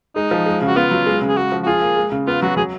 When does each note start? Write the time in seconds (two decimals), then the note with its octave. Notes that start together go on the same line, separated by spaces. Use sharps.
0.15 G#3 D#4
0.31 F3
0.46 G#3
0.62 C#3
0.67 F#4
0.76 B3 F4
0.91 F#3
1.06 G#3
1.22 C#3
1.28 G#4
1.37 G#3 F#4
1.52 F3
1.63 F#4
1.66 F4 G#4
1.81 A#3
1.97 G#3
2.12 C#3
2.27 B3 F4
2.42 F#3 F#4
2.57 F#3 G#4